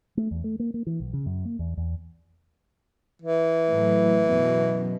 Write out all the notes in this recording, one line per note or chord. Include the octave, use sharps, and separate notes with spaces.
A3
E2
A3
A#3
A#3
E3
B1
C#3
F#2
A#3
E2
E2
E3
A2 F#3
F#2 B2